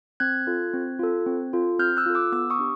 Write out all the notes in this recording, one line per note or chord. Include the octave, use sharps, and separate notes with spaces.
C4 F#6 G#6
F4 A4
C4
F4 A4
C4
F4 A4
C4 F6 G6
E6 F#6
F4 A4
D6 E6
B3 D6 E6
C#6 D#6
D4 G4